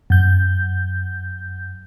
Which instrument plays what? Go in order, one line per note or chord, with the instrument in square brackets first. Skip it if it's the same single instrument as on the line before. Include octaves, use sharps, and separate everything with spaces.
[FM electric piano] F#2 G6